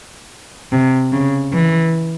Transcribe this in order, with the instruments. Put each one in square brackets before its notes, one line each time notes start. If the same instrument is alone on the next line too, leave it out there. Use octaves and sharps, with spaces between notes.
[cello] C3
C#3
E3